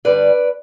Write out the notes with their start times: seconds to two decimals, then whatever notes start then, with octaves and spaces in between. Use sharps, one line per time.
0.05 G2 D3 G3 B4 D5